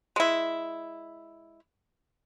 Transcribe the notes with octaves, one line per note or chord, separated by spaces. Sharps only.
G#3 E4